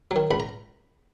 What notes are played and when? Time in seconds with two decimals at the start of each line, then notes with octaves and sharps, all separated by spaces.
0.11 D#3 F#3
0.31 C#2 B5
0.40 A#5